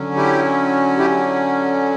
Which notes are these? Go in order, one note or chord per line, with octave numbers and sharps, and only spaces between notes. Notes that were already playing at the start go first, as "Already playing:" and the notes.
Already playing: D3 F#3 C#4
E4 G4
E4 G4